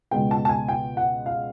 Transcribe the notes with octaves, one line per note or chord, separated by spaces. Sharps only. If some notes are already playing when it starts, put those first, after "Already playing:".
C#2 B2 G#3 B3 G5
A5
A5
G#5
G5
F#5
F5